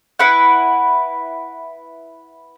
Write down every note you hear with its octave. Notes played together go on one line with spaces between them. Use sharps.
E4 B4 F#5